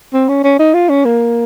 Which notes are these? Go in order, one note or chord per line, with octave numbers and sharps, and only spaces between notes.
C4
C#4
C#4
D#4
F4
C#4
A#3